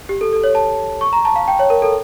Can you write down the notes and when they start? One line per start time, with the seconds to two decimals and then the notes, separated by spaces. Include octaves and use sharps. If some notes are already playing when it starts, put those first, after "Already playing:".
0.09 G4
0.21 A4
0.33 A4
0.44 C#5
0.55 A5
1.01 C#6
1.13 A#5
1.25 A5
1.36 F5
1.48 G5
1.59 C#5
1.70 A#4
1.82 A4